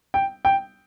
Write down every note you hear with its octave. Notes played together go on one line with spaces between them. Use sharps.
G5
G5